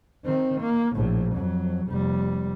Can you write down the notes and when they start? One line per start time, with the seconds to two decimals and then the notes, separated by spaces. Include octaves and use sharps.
0.25 D#3 C4
0.61 A#3
0.95 A#1 A2
1.34 F2 F#3
1.87 F1 G3